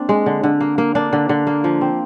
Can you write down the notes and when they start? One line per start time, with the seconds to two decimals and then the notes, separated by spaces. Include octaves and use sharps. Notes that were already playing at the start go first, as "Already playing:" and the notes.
Already playing: A#3 C4 D4
0.09 G#3
0.26 D3
0.43 D3
0.60 A#3
0.78 A#3
0.95 A#3 D4
1.13 D3
1.29 D3
1.47 A#3
1.64 F3
1.81 C4